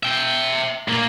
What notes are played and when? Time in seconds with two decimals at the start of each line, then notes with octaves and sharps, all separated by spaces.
0.03 E5 G5
0.88 A#2 A#3